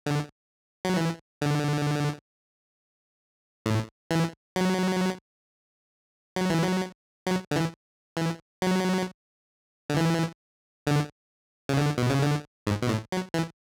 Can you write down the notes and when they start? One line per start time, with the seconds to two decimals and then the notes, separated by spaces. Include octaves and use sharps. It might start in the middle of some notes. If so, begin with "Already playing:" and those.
0.06 D3
0.85 F#3
0.96 E3
1.42 D3
3.66 A2
4.11 E3
4.56 F#3
6.36 F#3
6.50 E3
6.63 F#3
7.27 F#3
7.51 D3
7.56 E3
8.17 E3
8.62 F#3
9.90 D3
9.96 E3
10.87 D3
11.69 C#3
11.77 D3
11.98 B2
12.10 C#3
12.22 D3
12.67 G#2
12.82 B2
12.89 A2
13.12 F#3
13.34 E3